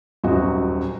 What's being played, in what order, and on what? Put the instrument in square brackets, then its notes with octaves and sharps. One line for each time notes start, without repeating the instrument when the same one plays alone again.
[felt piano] D#1 F#2 F#4 D#5